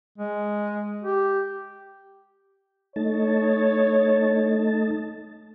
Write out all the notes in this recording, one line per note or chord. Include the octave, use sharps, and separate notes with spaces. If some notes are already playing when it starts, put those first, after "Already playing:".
G#3
G4
A3 D#4 C#5 A5